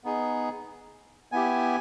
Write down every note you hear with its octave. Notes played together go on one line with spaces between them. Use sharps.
B3 D#4 G#4
B3 E4 G4 G#5